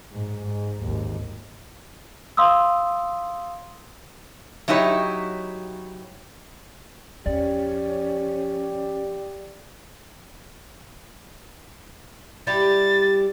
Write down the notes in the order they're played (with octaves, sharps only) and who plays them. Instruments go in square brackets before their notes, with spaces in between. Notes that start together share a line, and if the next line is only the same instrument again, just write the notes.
[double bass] G#2
G#2
G#1 D#2
[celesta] F5 C6 D#6 E6
[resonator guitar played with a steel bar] F#3 D#4 E4 G4 C#5
[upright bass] E2 F3 [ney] C#4 [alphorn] G4 [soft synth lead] D5
[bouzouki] G3 E4 G4 [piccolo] A6